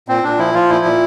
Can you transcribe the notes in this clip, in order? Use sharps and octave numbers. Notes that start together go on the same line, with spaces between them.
A#2 C4
A#2 D4
F3 E4
F3 F4
A#2 E4
A#2